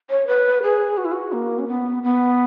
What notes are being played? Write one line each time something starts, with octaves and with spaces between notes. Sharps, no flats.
C#5
B4
G#4
F#4
E4
F#4
A#3
C#4
B3
B3